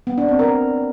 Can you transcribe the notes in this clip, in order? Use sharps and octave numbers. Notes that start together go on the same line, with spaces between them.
B3
D4
C4
A#4